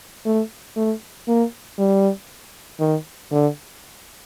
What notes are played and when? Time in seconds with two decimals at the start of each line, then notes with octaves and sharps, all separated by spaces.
0.26 A3
0.76 A3
1.28 A#3
1.79 G3
2.80 D#3
3.31 D3